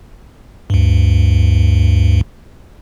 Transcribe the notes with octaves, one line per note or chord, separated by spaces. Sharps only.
D2 G2